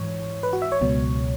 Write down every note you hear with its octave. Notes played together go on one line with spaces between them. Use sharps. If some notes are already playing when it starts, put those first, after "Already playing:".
Already playing: G#2 E3 C#5
B4
F#4
E5
C#5
C#2 B2 F#3